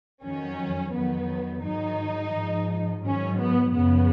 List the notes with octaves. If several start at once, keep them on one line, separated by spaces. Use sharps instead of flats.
F2 D#3 F#3 C#4
F2 D#3 F#3 B3
G#2 D#3 F#3 D#4
G#2 F3
G#2 D#3 F#3 C#4
B3
F#2 C#3 F3 B3